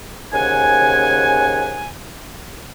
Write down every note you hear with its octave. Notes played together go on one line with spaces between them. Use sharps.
D#2 C#3 C5 F#5 G#5